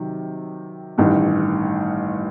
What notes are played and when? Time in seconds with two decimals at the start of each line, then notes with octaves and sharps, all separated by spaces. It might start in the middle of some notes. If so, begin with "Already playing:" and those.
Already playing: C3 D#3 F#3
0.98 A1 G2 D#3